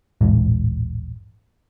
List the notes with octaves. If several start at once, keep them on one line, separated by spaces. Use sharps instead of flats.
D#1 A1 G#2